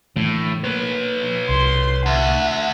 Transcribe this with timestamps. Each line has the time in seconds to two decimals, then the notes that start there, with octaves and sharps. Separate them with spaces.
0.16 A2 D3 E3 A3
0.64 A#3 B4 C#5
1.49 C2 C6
2.06 D2 E5 F#5